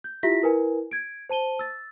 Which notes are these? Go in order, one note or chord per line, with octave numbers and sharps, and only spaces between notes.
G6
E4 F4 G4 E5 A#6 B6
E4 A#4 B4 G#5
G#6 D7
C5 A5 D#7 G7
E6 A6